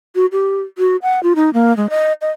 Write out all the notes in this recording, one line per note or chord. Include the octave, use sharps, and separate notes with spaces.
F#4
G4
F#4
F#5
F4
D#4
A#3
G#3
D#5
D#5